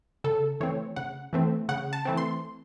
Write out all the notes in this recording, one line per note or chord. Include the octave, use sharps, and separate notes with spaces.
C#3 A4
E3 A3 C4 C#5
C#3 F#5
E3 A3 C4
C#3 F#5
A5
E3 A3 C4
C6